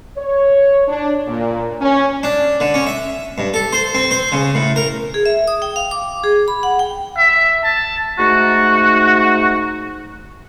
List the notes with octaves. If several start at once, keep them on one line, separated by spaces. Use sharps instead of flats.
C#5
D4
A#2
C#4
D4
D3
C#4
E5
G2
A4
C5
C4
C5
C#3
A2
A#4
G#4
E5
D#6
G5
F5
D6
G#4
B5
F#5
G5
E5
A5
G#2 A3 D#4 F#4